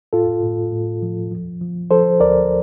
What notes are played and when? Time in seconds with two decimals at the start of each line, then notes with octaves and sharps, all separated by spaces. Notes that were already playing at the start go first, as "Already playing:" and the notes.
0.13 A2 F4 A4
0.43 A2
0.73 A2
1.02 F3
1.31 F3
1.61 F3
1.91 F3 A4 C5
2.20 D2 A#4 D5